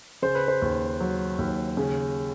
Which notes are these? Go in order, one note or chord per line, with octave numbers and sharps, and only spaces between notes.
C#3 C5
B4
C5
D#2
F#3
D#2
C#3